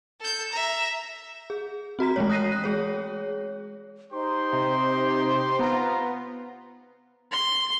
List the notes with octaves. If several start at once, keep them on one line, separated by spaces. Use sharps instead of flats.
A4 G6
E5 A#5
G#4
C4 F#4 A#5 B6
E3 G#3 A3 C#5
D#6 F#6 A#6 C7 D#7
F#6
G#3 G#4 C#5
D#4 G4 C5 C6
C3
B3 F4 A#5
C6